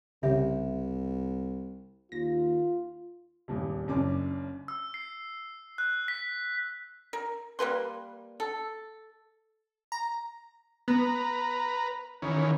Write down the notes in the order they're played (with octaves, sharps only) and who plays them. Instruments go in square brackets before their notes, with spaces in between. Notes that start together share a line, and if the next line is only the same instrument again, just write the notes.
[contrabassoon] C2 [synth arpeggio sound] C#3 G4 [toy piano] E5
[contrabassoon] D#2 [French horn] F4 [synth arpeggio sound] A#6
[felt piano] D#1 E2 G2
F#1 F#2 C#4 D4 D6
[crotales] E6
C7
F#6
B6
[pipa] A#4
G3 A#3 B4 C6
A4
[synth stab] A#5
[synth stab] B3 [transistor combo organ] B4 A#5
[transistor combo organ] D#3 E3 C#4